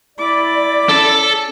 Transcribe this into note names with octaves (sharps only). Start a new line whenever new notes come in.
E4 D5 B5 D6
C#4 A4 A5